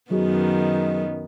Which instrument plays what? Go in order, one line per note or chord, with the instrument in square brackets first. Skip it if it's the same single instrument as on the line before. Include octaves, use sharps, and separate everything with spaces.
[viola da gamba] F#2 D#3 B3 [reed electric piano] F#3 F#4 G#4 [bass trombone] D#4